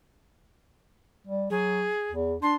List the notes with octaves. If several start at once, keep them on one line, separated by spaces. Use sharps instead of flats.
G3
F#3 G#4
E2
D4 C6